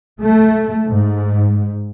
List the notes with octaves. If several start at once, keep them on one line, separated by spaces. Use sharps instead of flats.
A3
G#2